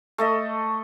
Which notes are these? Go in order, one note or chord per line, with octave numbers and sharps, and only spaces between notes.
A3 A4 D#5